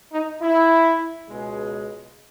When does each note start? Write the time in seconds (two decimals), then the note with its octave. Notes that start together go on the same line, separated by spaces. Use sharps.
0.13 D#4
0.42 E4
1.29 C#2 B2 G#3